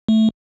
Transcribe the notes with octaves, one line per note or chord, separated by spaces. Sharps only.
A3